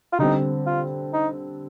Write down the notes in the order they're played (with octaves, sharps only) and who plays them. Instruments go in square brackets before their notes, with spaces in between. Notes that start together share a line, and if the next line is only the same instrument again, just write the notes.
[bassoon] F4
[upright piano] D3 G3 C4 [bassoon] D#4
[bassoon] F4
D#4